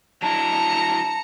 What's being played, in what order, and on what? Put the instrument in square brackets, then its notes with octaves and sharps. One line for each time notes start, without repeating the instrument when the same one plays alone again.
[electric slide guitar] F#3 D4 E4 [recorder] A5 [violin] A#5 C#7